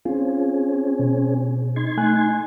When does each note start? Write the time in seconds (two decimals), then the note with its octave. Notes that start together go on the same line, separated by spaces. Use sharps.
0.05 C4 C#4 F4 G#4
0.99 B2
1.76 D#4 C6 G#6
1.97 A3 G#5 F#6